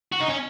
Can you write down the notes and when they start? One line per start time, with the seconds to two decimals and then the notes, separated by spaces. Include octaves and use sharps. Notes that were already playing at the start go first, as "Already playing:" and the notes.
0.12 F#4
0.21 D#4
0.29 C#4